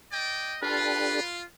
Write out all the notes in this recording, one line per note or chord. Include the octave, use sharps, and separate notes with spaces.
D5 D#5 G5
D4 F4 G4 A4 B4